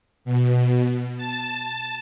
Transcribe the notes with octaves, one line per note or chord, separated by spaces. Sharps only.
B2
A5